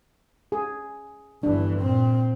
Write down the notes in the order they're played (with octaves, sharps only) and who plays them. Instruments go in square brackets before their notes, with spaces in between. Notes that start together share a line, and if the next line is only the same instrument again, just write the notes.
[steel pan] G#4
[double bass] G1 E3 [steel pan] D4
[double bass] A#2 C4